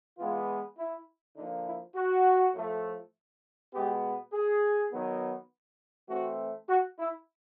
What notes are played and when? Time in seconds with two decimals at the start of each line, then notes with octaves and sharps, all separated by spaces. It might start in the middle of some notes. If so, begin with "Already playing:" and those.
0.18 E3 G#3 B3 F4
0.78 E4
1.36 D3 F3 A#3 D#4
1.66 E4
1.96 F#4
2.55 A2 F3 A3
3.73 B2 G#3 B3 G4
4.33 G#4
4.92 D#3 F#3 B3
6.09 E3 A3 C4 F#4
6.69 F#4
6.99 E4